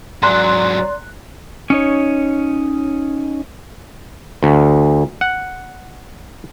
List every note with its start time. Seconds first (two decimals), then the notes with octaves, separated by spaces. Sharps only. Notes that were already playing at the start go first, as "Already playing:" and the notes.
0.22 G#2 F#3 D5 A#5 C6 F#6
1.70 C#4 D#4 C#5
4.43 D2
5.21 F#5